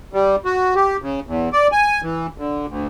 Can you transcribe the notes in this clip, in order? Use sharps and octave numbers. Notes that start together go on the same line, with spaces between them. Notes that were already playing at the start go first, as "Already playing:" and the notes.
G3
F#4
G4
C#3
E2
D5
G#5
E3
D3
D2